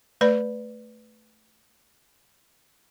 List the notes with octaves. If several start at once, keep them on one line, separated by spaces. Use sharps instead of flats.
A3 B4 D5 B5